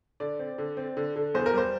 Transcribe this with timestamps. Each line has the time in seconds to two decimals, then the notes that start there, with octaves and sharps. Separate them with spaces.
0.20 D3 D5
0.39 C4
0.58 D3
0.77 C4
0.97 D3
1.16 D3
1.34 E2 C5
1.46 A#4
1.54 G3 C5